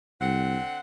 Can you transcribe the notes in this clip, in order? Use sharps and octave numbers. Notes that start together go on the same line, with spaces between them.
C2 D3 C4 F#5